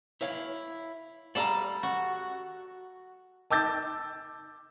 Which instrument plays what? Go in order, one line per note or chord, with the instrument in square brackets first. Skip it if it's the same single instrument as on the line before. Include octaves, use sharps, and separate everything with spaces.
[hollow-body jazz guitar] E4 C#5 F5
[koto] G3 A4 [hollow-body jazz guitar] D5 F5 A#5
[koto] F#4
[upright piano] A5 D6 E6 G6 A6